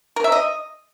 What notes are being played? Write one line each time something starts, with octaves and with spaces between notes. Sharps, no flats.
A#4
E5
D#5